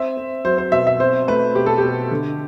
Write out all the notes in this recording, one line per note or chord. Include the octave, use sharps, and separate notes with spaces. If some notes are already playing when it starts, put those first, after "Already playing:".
Already playing: C4 E5
C4
F#3 C5
C5
B2 E5
E5
C4 C5
A3 B4
B2 G4
A4
G4
B2
D3